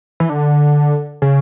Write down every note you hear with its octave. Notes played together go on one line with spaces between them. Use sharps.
E3
D3
C#3